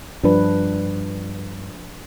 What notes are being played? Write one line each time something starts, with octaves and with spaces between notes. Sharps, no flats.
G2 F3 D4 B4